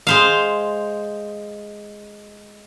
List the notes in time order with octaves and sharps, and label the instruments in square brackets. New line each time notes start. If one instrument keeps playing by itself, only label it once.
[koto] G#3 C5 F5